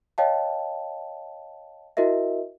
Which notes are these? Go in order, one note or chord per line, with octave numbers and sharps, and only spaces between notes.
C#5 D#5 F5 G5 A5
E4 F#4 A#4 D#5 E5